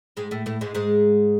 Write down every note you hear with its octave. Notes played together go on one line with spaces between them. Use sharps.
G#2 G#3
A2 A3
A2 A3
G#2 G#3
G#2 G#3